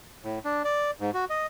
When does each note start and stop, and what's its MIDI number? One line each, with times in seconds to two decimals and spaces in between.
0.24 0.39 45
0.45 0.62 62
0.65 0.91 74
1.00 1.11 44
1.14 1.25 66
1.30 1.46 75